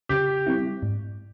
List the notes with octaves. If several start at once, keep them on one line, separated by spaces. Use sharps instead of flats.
C#3 G4
G3 C4 E4
G#2